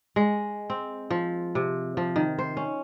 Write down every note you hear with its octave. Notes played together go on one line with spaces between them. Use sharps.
G#3
C4
F3
C3
F3
D#3
C5
C#4